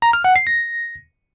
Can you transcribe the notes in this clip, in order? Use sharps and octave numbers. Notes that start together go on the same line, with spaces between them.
A#5
F6
F#5
C7
A#6